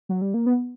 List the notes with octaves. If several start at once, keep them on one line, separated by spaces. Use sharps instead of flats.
F#3
G3
A#3
B3